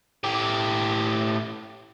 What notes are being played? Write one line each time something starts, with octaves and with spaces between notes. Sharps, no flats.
A2 G4